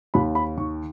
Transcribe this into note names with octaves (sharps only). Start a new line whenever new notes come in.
D#2 B5
B5
D#3 C#6